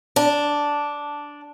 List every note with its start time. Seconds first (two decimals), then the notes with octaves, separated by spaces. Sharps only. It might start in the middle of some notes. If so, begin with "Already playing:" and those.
0.16 D4